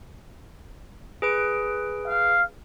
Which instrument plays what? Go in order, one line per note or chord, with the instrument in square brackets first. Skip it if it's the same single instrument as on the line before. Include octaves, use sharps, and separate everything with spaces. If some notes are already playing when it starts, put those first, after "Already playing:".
[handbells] G#4 B4 D7
[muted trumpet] F5